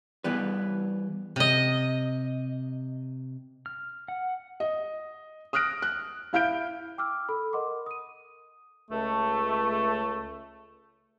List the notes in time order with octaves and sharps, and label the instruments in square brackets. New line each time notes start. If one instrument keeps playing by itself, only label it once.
[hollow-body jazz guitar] E3 G3 B3 B4
[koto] C3 D#5
[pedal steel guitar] F6
F#5
[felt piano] D#5
D#6 F6 F#6 A#6 D7
F#6
E4 F5 F6 G6 D7
[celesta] G5 D6 E6 F6
A4 B5
A#4 D#5 F#5 C6 D6
D#6 D#7
[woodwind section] C#2 A3